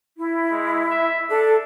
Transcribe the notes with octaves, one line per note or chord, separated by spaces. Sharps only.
E4
G#3
E5
D4 A4